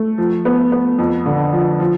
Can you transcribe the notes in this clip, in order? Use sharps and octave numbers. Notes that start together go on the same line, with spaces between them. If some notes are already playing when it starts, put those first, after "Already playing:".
Already playing: A3
F3
B3
B3
F2
D3
F3
F3